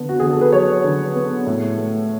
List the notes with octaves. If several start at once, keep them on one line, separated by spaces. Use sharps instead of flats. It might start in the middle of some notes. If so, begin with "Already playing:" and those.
Already playing: D3 B3
F#4
D3 G#4
A4
B4
F#3 C#5
D3
B3
A2
A3